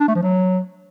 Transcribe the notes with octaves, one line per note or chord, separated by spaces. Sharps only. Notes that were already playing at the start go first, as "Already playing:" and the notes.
D4
A3
F3
F#3